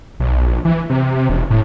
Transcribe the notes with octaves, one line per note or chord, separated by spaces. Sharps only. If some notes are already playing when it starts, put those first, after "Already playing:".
B1
A#1
E3
C3
E1
A2